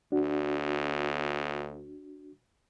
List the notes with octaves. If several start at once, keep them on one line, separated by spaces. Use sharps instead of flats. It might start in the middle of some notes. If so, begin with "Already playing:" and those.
D2 D4 F#4